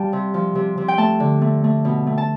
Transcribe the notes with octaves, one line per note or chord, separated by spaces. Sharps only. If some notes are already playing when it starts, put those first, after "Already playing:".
Already playing: G3 F5 G5 A5
C3
F3
C3
C3
G5
A3 A5
D3
A3
A3
B2
A3
A5